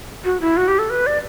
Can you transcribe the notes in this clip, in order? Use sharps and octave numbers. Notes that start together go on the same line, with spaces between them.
F#4
E4
F#4
G4
A4
B4
D5